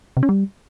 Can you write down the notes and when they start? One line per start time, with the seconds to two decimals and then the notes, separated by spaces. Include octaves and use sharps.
0.17 C3
0.23 C#4
0.29 G3